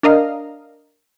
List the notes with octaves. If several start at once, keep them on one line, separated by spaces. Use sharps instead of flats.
D4 A#4 D#5 F5